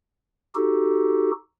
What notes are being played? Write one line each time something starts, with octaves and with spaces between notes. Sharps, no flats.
D#4 F#4 G4 A4